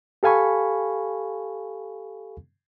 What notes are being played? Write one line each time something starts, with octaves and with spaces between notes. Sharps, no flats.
G4 A4 F5 G#5 B5 C#6